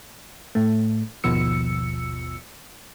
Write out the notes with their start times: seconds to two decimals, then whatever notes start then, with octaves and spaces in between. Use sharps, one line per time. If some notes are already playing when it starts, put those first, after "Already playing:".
0.55 A2 A3
1.24 G#1 D#2 B2 F3 E6 C#7